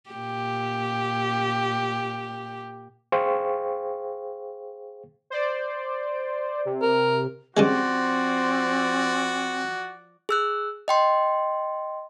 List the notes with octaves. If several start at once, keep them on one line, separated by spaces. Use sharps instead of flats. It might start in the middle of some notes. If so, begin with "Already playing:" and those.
A#2 G4
G#4 C5 F5 G5 C#6
C5 D5
C3
A#4
C#3 F3 G3 G#3 C4 F#4 D5
G#4 E6 F#6
D#5 G5 C6